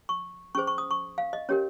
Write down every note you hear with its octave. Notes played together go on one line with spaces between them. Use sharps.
C#6
C#4 G#4 C5 C#6
C#6
D#6
C#6
F5
D#5
C#4 G4 A#4 C#5